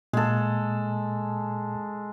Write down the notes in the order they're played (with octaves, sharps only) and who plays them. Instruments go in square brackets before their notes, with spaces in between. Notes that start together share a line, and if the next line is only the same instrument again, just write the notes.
[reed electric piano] A#2 [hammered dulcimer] G#3 A4